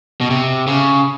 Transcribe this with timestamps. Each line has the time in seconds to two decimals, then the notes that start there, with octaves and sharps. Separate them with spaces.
0.21 B2
0.30 C3
0.67 C#3